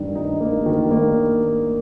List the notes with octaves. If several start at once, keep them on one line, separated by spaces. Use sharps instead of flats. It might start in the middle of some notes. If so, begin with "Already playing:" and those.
Already playing: G2 D#3
D#4
A#3
D#3
A#3